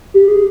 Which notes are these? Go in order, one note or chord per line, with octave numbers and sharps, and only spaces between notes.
G4
G#4